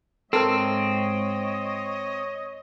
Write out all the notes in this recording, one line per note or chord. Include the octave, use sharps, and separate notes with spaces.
G#2 C4 A4 A#4 C#5 D#5